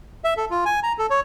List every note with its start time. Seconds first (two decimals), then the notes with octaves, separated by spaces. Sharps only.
0.24 E5
0.37 A4
0.51 F4
0.66 G#5
0.83 A#5
0.99 A4
1.10 C#5